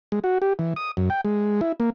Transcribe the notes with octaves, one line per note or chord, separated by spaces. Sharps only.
G#3
F#4
G4
E3
D#6
F#2
G5
G#3
E4
A#3